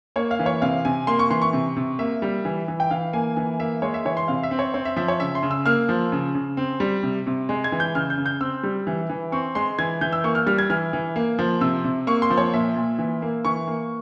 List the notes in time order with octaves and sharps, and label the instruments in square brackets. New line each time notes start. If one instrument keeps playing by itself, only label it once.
[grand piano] A#3 C#5
F5
E3
C#5
C3 F5
C3 G#5
A#3 C6
C#6
E3 C6
C#6
C3
C3
A#3 E5
G3
E3
E3
G5
E3 F5
A#3 G#5
E3 G#5
A#3 E5
G#3 C#5
E5
E3 C#5
C6
C3 F5
E5
C4
C#5
C4 C#5
E5
F3 E5
C#5
C#3 E5
C6
C#3
E6
A#3 F6
F3
C#3
C#3
C4
G3
C3
C3
G#3
G#6
E3
G6
C#3 F6
G6
C#3
G6
C4 E6
G3
E3
E3
C4 C#6
G#3 C6
E3 G#6
E3 G6
E6
A#3 C#6
F6
G3 F6
G#6
E3 F6
E3
A#3
F3
C3 E6
C3
A#3 C#6
C6
F3
C#5
A#2 E5
A#2
E3
A#3
E3 C#6
A#3